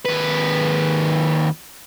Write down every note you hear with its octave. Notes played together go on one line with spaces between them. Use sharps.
D#2 B4